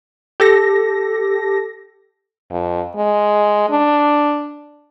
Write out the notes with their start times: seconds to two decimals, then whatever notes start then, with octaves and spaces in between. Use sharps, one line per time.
0.40 G4 A4 A#6
2.51 F2
2.96 G#3
3.70 D4